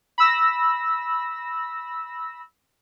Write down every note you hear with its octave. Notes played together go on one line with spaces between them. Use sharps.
B5 E6 A#6